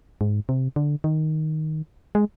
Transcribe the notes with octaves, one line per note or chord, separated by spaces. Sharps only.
G#2
C3
D3
D#3
G#3